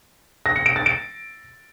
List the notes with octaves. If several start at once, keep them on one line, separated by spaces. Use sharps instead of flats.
A#6
C#7
D7
A6
D7